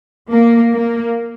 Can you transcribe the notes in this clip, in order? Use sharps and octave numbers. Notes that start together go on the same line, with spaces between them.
A#3
A#3